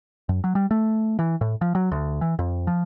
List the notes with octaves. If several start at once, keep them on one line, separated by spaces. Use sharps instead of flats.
F#2
F#3
G3
A3
E3
A2
F3
F#3
D2
E3
F2
F3